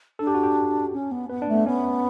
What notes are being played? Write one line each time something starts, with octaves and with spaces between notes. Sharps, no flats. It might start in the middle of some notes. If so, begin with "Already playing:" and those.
D4 A4
G4
F#4
G4
C#4
B3
B3 B4
D4
A3
B3
B3 C#4